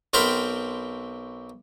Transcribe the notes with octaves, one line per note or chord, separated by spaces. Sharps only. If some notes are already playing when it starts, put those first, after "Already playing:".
B1 C4 A#4 G5 B5 C6